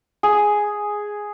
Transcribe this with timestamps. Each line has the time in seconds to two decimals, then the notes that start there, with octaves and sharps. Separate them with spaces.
0.23 G#4